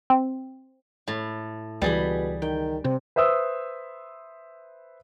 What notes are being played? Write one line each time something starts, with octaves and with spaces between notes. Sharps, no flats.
C4
A2
C#2 B2 E3 G3 G#4 B5
D#3 G5
C3 C4
B4 C5 E5 D#6 E6